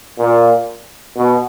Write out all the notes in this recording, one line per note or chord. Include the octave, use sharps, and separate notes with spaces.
A#2
B2